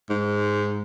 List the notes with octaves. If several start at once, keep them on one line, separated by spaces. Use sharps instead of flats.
G#2